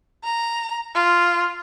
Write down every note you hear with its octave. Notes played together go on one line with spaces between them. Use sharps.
A#5
F4